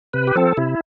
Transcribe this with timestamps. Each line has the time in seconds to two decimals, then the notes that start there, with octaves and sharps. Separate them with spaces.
0.13 C3 B4
0.27 G4
0.35 F3 C4 A4
0.57 C3 E4